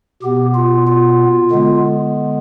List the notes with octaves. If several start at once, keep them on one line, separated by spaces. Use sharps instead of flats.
B2 B3 G4
F4
F4
D3 G#3 B3